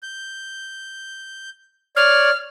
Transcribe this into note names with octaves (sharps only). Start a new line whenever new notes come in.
G6
C#5 D5 F6